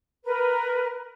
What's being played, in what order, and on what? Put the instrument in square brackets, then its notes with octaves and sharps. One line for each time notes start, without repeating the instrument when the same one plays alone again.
[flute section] A#4 B4